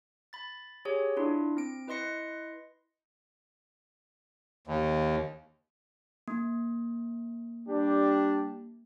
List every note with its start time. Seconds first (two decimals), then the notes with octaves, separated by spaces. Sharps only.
0.33 B5 A6
0.85 G4 G#4 C#5
1.17 D4 E4 F4
1.57 C4 D7
1.87 E4 B4 D#5 C6 A#6 C#7
4.67 D#2
6.28 A#3
7.69 G3 D4 G4